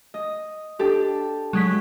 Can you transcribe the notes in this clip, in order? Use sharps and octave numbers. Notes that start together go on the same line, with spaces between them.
D#5
D4 G4 A4
F#3 G#3 B6